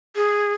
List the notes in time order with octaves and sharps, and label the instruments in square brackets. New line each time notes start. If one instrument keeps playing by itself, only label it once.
[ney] G#4